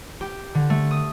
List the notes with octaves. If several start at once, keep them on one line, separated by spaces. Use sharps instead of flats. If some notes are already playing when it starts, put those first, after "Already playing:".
G4
D3
A3
D#6